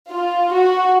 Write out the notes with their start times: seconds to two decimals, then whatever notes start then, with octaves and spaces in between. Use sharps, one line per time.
0.09 F4
0.52 F#4